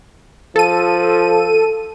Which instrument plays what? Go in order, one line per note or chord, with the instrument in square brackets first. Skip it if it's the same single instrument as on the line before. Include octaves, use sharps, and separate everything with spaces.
[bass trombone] F3 [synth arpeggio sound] A4 D#7